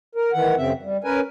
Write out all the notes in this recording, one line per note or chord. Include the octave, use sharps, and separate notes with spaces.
A#4
D#3 E3 F#5
F#2 C#3 C4 E5
G3
C#4 A#4 B4 G#5